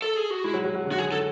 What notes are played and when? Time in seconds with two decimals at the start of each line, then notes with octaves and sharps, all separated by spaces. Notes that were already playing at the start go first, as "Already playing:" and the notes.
0.02 A4
0.16 G#4
0.30 F#4
0.44 G#3 E4
0.54 F#3
0.64 F#3
0.75 F#3
0.85 D3
0.92 F#4
0.98 G#4
1.12 A4